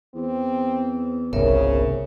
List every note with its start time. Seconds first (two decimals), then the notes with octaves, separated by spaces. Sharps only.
0.15 E2 C4
1.33 G1 C2 C#3 A#4 C#5 E5